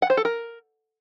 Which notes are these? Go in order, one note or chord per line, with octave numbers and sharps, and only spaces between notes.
F#5
C5
A4
A#4